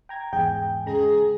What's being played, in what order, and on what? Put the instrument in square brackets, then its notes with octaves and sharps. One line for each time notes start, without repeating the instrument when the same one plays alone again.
[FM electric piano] G5 A#5 G#6
[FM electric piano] E2 G#2 G#4 [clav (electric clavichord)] G5
[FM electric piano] C#3 G#3 A#5 [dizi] G#4